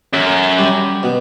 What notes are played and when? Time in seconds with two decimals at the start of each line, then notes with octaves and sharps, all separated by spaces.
0.13 F#2 A3
0.58 G3
1.03 B2